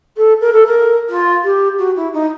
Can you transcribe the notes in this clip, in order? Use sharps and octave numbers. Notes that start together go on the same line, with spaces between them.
A4
A#4
A4
A#4
F4
G4
F#4
E4
D#4